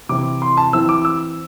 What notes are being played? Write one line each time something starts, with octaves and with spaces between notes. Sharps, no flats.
C3 E3 C4 E4 D6
C6
A5
E3 C4 E4 E6
D6
E6